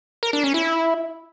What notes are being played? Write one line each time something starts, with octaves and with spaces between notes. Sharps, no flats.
A#4
D4
C#4
E4